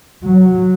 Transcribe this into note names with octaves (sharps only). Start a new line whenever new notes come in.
F#3